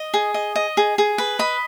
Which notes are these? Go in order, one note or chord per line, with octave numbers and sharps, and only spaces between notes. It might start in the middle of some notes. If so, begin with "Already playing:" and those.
Already playing: D#5
G#4
D#5
D#5
G#4
G#4
B4
D#5 B5